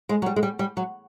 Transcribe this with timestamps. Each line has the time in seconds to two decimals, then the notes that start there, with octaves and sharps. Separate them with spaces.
0.09 G#3
0.22 F#3
0.26 G3
0.36 G#3
0.43 G3
0.59 G3
0.77 F#3